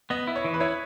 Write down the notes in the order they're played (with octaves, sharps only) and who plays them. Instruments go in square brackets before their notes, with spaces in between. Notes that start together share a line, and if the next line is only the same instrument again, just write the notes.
[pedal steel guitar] B3 [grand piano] D#5
[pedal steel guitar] E4
[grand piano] C#5
[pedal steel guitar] E3
[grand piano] B4
[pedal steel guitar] E4 [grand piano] C#5